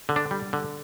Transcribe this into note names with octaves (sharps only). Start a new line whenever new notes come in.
D3
D4
G3
D3